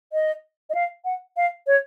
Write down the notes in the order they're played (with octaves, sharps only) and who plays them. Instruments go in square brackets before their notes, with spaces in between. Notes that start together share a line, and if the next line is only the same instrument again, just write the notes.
[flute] D#5
D#5
F5
F#5
F5
C#5